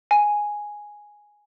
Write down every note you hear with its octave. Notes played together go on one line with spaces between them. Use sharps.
G#5